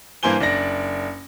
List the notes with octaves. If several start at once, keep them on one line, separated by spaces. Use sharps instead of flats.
G2 E3 A#3 C5 G#5 G7
F#1 D4 D5 A#6